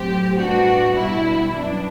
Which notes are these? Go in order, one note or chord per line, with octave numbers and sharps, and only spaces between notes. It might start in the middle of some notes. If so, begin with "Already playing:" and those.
Already playing: A2 F#3 C4 G4
A2 G3 B3 D4 F#4
B2 G3 D4 E4
F#2 E3 B3 D4